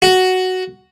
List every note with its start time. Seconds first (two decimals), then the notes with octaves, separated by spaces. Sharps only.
0.02 F#4